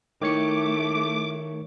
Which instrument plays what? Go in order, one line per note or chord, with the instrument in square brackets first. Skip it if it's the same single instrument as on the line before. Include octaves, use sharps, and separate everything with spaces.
[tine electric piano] D#3 C#5 C#7 [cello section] A3 [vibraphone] D#4 E4 [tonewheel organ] D6